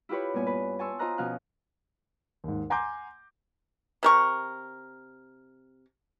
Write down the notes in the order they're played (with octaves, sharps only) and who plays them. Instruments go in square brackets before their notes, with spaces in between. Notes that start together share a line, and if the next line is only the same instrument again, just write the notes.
[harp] E4 F4 G4 B4 C#5
G2 A#2 B3 G#5
B4
G#5 A5 C6 C#6 E6
F4 C5 D#5 A#5 F#6
B2 F3 C#4 F5 F#6
[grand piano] D#2 G#2
F#5 G#5 A#5 C6 D6 G6
[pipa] C3 A#4 C#6